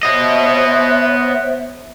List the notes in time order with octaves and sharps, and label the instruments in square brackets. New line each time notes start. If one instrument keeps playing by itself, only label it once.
[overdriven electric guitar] B3 D#5 [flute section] C5 C#5 E5